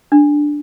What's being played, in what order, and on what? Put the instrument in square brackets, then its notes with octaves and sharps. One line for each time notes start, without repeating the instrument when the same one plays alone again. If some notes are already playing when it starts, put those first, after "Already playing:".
[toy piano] D4